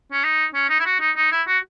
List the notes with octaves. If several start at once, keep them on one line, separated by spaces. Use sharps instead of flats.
C#4
D#4
C#4
D#4
E4
F#4
D#4
D#4
E4
F#4